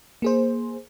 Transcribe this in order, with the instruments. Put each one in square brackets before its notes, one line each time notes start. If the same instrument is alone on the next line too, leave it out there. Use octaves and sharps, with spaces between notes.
[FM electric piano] A#3 G#4 C5